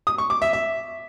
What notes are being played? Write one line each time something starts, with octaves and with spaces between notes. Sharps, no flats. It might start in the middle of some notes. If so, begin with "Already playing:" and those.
D#6
C#6
D6
E5
E5